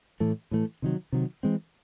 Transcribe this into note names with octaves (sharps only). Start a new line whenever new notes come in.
A2 E3 A3
A2 E3 A3
C3 D#3 F#3
C3 D#3 F#3
E3 G#3 C4